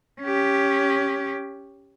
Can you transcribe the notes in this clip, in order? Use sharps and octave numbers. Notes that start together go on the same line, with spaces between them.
C#4 G4